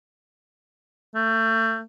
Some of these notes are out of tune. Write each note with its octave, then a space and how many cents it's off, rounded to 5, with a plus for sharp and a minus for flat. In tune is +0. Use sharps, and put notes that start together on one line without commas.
A3 +30